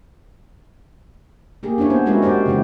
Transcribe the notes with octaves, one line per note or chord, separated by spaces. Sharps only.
A#3 G4 G#4
C#4 D4 E4 C#5
B3 C5
G#3 C4 C#4 E4 F#4 A#4
C#4 F#4 G4 C5 D5
C#3 E3 G#3 C4 E4